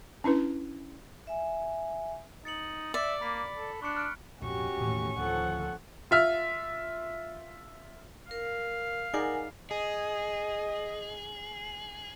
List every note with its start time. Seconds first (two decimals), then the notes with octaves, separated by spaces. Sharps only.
0.24 C#4 D4 E4 B4
1.27 E5 G#5
2.45 D#4 A6 C#7 F#7
2.94 D5 E5
3.21 A#3 B5 B6
3.56 A4
3.82 D4 C#6 F#6 C#7
3.96 F6 F#6 D7
4.42 A#1 F2 G#2 C#4 F#4 G4 C#6
4.77 E1 D#2 A2
5.17 D2 D3 D#3 F3 A4 F#5
6.11 F4 E5 F6
8.31 A#4 F5
9.14 D#4 G#4 A#4 D5 F#5 G#5
9.71 G#4 D#5